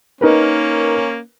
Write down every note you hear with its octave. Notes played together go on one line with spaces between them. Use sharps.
A#3 C#4 D#4 A#4 B4